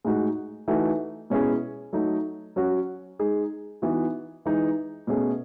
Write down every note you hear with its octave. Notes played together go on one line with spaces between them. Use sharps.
A2 G#3 D#4 F#4
E3 A3 D#4 F#4
B2 G#3 C#4 E4 G#4
F#3 A3 D#4
F#3 C#4 F#4
G#3 D#4 G#4
E3 B3 D#4 F#4
E3 G#3 D#4 G#4
B2 A3 C#4 G#4